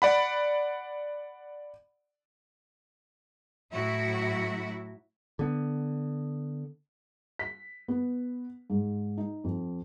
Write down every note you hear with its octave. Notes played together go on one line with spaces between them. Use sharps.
D5 F#5 B5
A2 F#3 E4 F#4 E5
D3 B3
B6
B3
G#2
D#4
F2